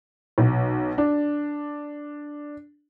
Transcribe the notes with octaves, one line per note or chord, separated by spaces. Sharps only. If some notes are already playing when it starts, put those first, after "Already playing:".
B1
D4